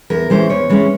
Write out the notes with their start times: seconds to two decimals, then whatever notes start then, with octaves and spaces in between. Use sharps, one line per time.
0.10 E2 A#4
0.30 E3 G#3 C#4 C5
0.50 E2 C#5
0.69 E3 G#3 C#4